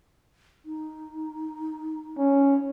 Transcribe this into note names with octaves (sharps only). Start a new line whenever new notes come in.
D#4
C#4